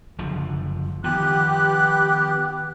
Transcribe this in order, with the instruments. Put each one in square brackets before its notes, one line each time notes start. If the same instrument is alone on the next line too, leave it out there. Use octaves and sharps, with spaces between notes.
[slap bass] F#1 D3 F3
[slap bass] D#3 F3 [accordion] B3 G4 [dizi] F#6